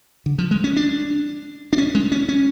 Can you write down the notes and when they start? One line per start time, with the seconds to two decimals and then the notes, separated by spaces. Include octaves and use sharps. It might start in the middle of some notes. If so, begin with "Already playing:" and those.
0.26 D3
0.38 F3
0.51 G#3
0.64 C#4
0.76 D4
1.73 D4
1.78 C#4
1.95 G#3
2.12 C#4
2.29 C#4